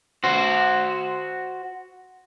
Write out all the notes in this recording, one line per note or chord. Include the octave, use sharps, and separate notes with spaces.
F#4 C5